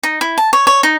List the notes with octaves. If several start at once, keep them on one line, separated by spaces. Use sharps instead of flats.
D#4
E4
A5
C#5
C#5
D#4